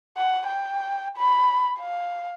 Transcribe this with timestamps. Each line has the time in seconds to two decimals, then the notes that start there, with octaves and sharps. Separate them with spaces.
0.17 F#5
0.47 G5
1.17 B5
1.80 F5